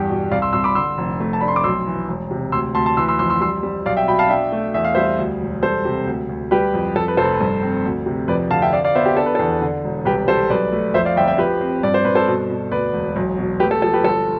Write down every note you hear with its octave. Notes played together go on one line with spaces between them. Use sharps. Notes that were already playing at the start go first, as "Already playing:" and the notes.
Already playing: E2 G2 G4
B2
C2 D5 F5
C6 E6
C2 C6 E6
B5 D6
D3 C6 E6
F1
A3
A5
D4 B5
C6
D6
B1 C6 E6
E3
E1
C3
D2 C6 E6
D2 A5 C6
A5 C6
E3 C6 E6
C6 E6
F2 C6 E6
C6 E6
G3 C6 E6
G3
B1 D5 F5
E5 G5
B2 G5 B5
F5 A5
D4 E5 G5
A3
E2 E5
F5
G3 C5 E5
D2
E1
G3 A4 C5
C3
D2
D2
G3 G4 B4
F2
F2 A4
B4
F1 A4 C5
G2
C4
D2
C3
F2 B4 D5
D3 F5 A5
E5 G5
D4 D5 F5
D5 F5
B3 C5 E5
G4
D4 A4
B4
E2 A4
D3
E1
C2 G4 B4
G3 A4 C5
B1 B4 D5
A3
F2 C5 E5
D5 F5
G1 E5 G5
E5 G5
F3 G4 B4
C4
G2 D5
C5
G2 B4
A4 C5
B2
B2
D2 B4 D5
E1
B1
B2
A3 G4 B4
A4
F3 A4
G4 B4
G1 A4